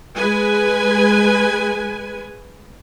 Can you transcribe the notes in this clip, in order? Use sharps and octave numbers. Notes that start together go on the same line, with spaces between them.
G#3 B4 G#5